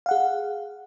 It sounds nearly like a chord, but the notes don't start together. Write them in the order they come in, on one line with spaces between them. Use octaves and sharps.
F5 F#5 G#4